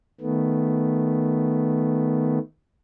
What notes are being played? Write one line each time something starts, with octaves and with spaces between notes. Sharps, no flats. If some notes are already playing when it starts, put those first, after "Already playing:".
D#3 A3 B3